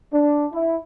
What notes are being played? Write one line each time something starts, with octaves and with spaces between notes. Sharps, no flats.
D4
E4